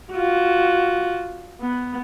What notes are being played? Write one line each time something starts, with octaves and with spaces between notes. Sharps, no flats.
F4 F#4
B3